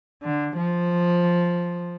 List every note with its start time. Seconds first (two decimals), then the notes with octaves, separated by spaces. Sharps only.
0.23 D3
0.56 F3